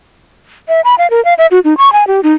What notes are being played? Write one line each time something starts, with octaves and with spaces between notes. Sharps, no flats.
E5
B5
F5
A#4
F5
E5
F#4
D#4
C#6
G#5
G4
D#4